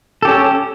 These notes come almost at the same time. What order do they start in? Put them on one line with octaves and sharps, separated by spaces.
A4 G4 C#4